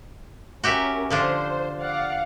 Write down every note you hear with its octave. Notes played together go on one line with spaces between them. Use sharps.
C#4 F#4 G4 A#4 E5
D3 F3 D4 C5
D5 F5 F#5